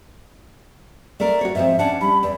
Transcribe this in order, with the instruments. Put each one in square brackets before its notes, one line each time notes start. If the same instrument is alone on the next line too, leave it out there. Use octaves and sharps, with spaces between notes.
[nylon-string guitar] A3 A#4 [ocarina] D5
[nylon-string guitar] F#4 C#5
[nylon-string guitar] G#2 F3 C4 [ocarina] E5
[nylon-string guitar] C#4 D4 F#5 [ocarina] A5
[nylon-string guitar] G3 [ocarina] B5
[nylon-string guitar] E2 [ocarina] D5